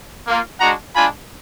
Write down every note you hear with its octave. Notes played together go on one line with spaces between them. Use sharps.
A#3 F4
G#3 D4 F#4 F#5 A#5
G#3 D4 F4 G#5 B5